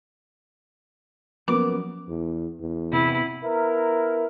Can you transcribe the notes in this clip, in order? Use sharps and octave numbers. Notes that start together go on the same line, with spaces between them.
F3 F#3 A#3 B3 C#4 D6
E2
E2
C3 B3 E4
B3 E4 A#4